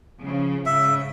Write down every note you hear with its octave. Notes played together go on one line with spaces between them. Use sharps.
C#3 F3
G#2 C#3 E5